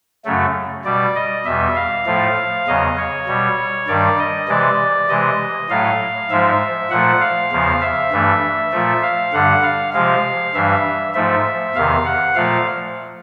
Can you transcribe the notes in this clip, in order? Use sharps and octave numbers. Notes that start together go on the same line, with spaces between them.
F#2 C#3 F#3 A3
B2 G3 D5
D#5
E2 B2 G3 E5
F5
A2 F3 A3
E2 C#3 F#3 D#5
C#5
B2 G3
G2 D#3 G3 D5
D#5
C3 E3 G#3 D5
C3 E3 G#3 D#5
A2 F#3 A3 F5
G#2 F3 G#3 E5
A#2 F3 A3 F#5
F5
E2 C#3 F3
E5
G2 E3 A3
A#2 F3 A3
F5
G2 D3 G3 F#5
F5
C3 F3 G#3 F5
G2 E3 G3 E5
G#2 F3 A3 E5
E2 C3 D#3 F5
F#5
A#2 F3 A3 F5